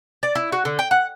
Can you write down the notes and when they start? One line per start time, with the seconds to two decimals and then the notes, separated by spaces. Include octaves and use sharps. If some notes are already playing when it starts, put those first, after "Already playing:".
0.23 D5
0.35 E4
0.52 F#4
0.65 D3
0.79 G5
0.91 F#5